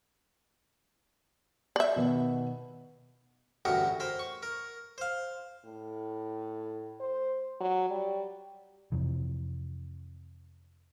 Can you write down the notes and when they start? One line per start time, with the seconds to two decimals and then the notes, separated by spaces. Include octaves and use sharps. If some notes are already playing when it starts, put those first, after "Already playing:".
1.76 D5 E5
1.96 B2 D#3 B3
3.65 A1 D2 G2 F#4 A#4 F#5
4.00 A#4 C5 B5
4.19 C#6
4.43 A#4
4.98 C5 F5
5.65 A2
7.00 C5
7.61 F#3
7.90 G3
8.92 F2 C3 E3